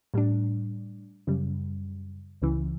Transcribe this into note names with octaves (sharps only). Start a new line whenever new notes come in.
A2 G3 D4
F#2 C#3 G3
C#2 C#3 E3